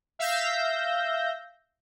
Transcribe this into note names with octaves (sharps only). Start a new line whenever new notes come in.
E5 F5 E6 G6 A#6